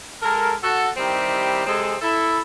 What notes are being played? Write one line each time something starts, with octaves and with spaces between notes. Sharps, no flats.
G#3 A4 A#4
F#4 A4
D#3 G3 C4 E4 G4
C3 G#3 C4 G#4 A4
E4 A4